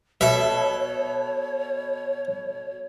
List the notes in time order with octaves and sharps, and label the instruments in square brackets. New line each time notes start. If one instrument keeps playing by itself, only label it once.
[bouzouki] B2 A4 [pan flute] C#5 [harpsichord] E5